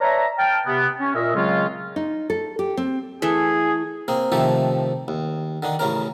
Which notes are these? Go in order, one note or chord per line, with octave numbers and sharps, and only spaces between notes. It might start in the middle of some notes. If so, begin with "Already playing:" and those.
B4 C#5 D5 E5 A5 A#5
G5 A5 F6
C3 B3
C#4
A#2 A#4 D#5 E5
C#3 F#3 G#3 C4 C#4 F4
D#4
A4
G4
C4
E3 A3 G#4 E5
A#3 C4 G#4
C3 D#3 F3 A3 G4 A4
D#2
D3 D#3 D4
A1 C#3 C#4 A#4